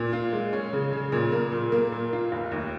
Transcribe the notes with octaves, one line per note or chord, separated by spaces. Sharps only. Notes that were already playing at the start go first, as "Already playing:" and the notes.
Already playing: A#2
F4
G#3
C#4
C#3
C#3
A#2
A#3
A#2
A#3
A#2
F4
F1
D#2